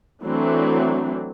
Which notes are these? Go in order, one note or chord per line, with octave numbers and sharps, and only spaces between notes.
E3 F#3 A3 C4 D4